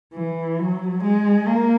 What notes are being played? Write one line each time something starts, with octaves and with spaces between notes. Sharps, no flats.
E3
F#3
G#3
A#3